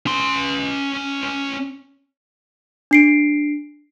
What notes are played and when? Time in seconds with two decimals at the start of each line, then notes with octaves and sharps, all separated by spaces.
0.06 C#4 C6
2.91 D4 C7 D7